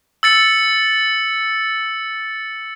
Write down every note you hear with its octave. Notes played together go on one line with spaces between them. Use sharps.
E6 A6 C#7